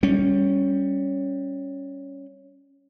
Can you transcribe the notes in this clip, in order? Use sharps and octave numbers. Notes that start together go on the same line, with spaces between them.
G3 C#4